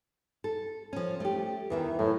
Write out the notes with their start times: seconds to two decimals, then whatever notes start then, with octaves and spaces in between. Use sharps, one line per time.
0.44 A4
0.93 F3 C#4
1.20 A3 G4
1.70 E2 D#3 E3 E5
1.99 F#2 A2